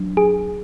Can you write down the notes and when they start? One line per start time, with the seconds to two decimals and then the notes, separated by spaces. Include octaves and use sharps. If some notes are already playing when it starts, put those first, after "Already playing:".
Already playing: F#3 D4
0.17 G#4